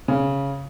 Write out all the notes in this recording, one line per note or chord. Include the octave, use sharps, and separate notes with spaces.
C#3